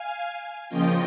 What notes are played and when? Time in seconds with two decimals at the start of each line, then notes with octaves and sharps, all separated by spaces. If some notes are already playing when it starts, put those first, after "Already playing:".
Already playing: F5 G#5
0.69 C#3 F3 A#3 C#4 F4 D#5 G5